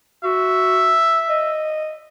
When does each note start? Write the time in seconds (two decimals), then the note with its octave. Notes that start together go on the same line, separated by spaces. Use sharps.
0.24 F#4 E5
1.30 D#5